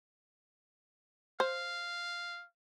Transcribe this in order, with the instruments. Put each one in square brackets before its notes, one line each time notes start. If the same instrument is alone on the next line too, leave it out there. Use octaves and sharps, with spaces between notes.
[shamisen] C5 [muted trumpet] F5